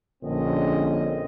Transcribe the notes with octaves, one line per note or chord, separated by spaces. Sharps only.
A#1 D3 C4 C#4 D#5